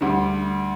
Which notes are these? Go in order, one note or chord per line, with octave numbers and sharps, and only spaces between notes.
D2 D3 G3